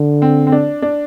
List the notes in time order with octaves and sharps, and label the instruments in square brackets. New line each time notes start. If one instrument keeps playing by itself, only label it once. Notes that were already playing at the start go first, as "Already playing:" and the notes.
Already playing: [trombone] D3
[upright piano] C4
C4
D4
D4